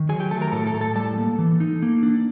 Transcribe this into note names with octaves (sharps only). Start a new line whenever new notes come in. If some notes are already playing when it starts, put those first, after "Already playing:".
Already playing: D#3
F#3 G#4 G#5
G4 G5
A3 A4 A5
A#4 A#5
A2 A4 A5
A4 A5
A2 A#5
A4 A5
G3 A4 A5
A#3
E3
D#4
A#3
D4